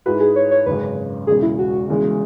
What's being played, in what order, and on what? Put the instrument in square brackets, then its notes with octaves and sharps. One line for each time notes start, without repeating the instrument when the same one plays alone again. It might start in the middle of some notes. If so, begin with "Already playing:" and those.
[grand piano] G#2 G#3 E4 B4 [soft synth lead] F#4
[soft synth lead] G#4
C#5
C#5
[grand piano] G#1 F#2 C#3 [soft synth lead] B4
[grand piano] E1 E2 C#3 [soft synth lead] G#4
[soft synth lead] E4
F#4
[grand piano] E1 E2 C#3 E3 G#3